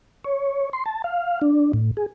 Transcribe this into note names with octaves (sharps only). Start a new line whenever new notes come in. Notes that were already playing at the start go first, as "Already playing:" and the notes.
C#5
C6
A5
F5
D4
A2
G#4